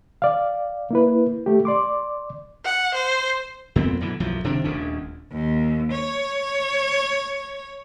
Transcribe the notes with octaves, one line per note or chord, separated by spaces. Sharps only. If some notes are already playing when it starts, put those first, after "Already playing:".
D5 F5
A#3 E4 B4
A3 G4
D5 C6 D6
F#5
C5
F2 A#2 B3 C4
F#2 B2 D3 E3
B1 F#2 E3 F3
F#1 C3 D#3 D4
D#1 D2 C#4 D4
D#2
C#5